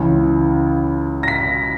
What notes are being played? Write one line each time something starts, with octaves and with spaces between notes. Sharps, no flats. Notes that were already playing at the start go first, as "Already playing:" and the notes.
Already playing: C#2 C#3 E3
A#6
B6